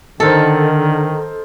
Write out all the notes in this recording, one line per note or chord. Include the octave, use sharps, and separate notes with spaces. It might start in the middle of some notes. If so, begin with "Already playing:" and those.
D3 D#3 D#4 A4 A#4 C5